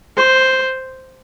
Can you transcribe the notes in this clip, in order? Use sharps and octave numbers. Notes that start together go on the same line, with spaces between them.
C5